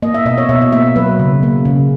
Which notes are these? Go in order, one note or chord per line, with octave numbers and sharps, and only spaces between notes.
A#3 D#5
E5
B2 D#5
C#5
B2 E5
E5
A#3 E5
F#3 B4
C#3
A#3
C#3